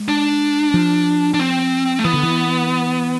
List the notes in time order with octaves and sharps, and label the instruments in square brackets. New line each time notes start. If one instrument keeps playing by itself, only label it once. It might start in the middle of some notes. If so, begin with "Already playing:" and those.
Already playing: [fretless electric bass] G#3
[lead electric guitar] D4
[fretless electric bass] F3
[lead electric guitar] D4
C4
A3
[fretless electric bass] E3 [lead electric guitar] B3
[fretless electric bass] D3
E3